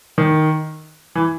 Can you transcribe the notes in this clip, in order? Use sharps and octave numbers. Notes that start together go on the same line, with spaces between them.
D#3
E3